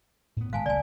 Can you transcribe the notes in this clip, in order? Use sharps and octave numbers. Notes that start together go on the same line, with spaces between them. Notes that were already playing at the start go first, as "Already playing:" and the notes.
A2 B3
G#1 G#3 B3 F5 G#5 A5
F#1 C#2 A3 D5 G#5